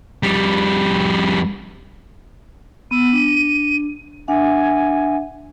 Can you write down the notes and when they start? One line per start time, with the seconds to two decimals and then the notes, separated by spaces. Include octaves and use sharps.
0.23 F2 G3
2.91 B3 E6 D#7
3.13 D4
4.28 D4 E5 F#5 G#5